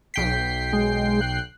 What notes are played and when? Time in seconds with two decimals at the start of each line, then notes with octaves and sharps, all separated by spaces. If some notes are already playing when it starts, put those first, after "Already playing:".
0.14 B1 G5 B6 C7
0.73 G#3
1.21 F#6